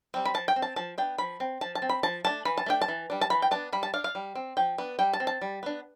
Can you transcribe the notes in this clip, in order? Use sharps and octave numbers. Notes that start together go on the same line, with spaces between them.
G3 C4
B5
F3 A5
G5
C4
A5
F3 A5
B3 D4 G5
F3 B5
C4
F3 A5
A5
C4
B5
F3 A5
A3 D4 A5
E3 B5
A5
A3 D4 G5
A5
E3
G3 D4
A5
E3 B5
G5
B3 D4 A5
G3 B5
A5
D4 F5
F5
G3
C4
F3 G5
B3 D4
G3 G5
A5
C4
A5
G3
B3 D4